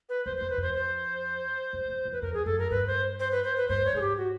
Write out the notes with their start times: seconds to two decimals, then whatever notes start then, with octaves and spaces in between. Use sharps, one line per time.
0.09 B4
0.25 F2 C5
0.37 F2 C5
0.50 B4
0.57 F2 C5
0.74 C5
1.73 F#2
1.88 F2
2.05 F2
2.12 B4
2.22 F2 A#4
2.34 G#4
2.46 F#2 A4
2.59 A#4
2.71 G2 B4
2.87 C5
3.20 C5
3.31 B4
3.44 C5
3.57 B4
3.69 G2 C5
3.85 C#5
3.93 G#2 G#4
4.01 G4
4.17 F#4